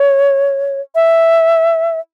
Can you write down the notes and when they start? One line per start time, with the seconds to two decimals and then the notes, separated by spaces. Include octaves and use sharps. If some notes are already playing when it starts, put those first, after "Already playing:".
Already playing: C#5
0.95 E5